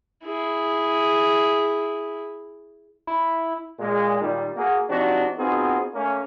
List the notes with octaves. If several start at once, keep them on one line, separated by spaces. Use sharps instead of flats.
E4 G#4
E4
A#2 G#3
A#2 D#3 G3
A#3 F#4 G#4
C3 F3 C4 D4 D#4 F#4
B3 C4 D#4 F4 F#4 G#4
A3 A#3 C#4